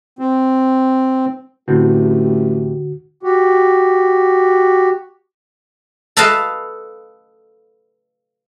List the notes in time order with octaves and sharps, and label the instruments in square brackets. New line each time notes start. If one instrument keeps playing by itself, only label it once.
[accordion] C4
[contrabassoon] A1 [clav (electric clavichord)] A2 C4 [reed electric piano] D3 F#4 [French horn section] G#3 A3 G4
[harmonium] F#4 G4
[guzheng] A4 B4 D#5 F5 A5